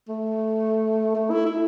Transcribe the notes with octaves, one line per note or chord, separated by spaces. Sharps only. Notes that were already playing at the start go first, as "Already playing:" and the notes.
A3
A3
E4
E4